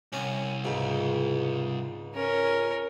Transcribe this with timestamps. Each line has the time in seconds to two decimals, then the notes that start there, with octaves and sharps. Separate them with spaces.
0.13 C2 C#4
0.65 C#2 G#2
2.15 C#4 A#4